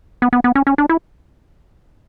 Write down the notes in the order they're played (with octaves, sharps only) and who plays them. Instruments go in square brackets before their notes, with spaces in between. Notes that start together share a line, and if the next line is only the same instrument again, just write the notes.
[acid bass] B3
B3
B3
C#4
C#4
D4
E4